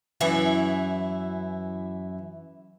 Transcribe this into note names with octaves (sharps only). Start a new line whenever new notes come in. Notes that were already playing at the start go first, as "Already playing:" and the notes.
F#2 E3 E4 E5 G#5